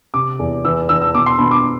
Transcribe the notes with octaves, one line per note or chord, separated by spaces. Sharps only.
C3 D6
E2
E3 E6
E3 E6
E6
B2 D6
C6
B2 B5
D6